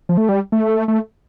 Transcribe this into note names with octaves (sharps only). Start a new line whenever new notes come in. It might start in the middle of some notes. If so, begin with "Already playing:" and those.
F3
A3
G3
A3
A3